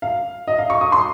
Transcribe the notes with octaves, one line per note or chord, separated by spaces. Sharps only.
F5
D#5
F5
C#6
D#6
C6